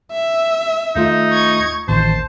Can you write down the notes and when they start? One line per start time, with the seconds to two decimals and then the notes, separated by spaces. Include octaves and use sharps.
0.12 E5
0.96 D#2 A3 D#4 F4
1.33 C#6 G#6
1.88 A1 D#2 C5 A5